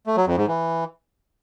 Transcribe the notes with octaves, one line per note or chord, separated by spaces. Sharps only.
A3
F#3
F2
G#2
E3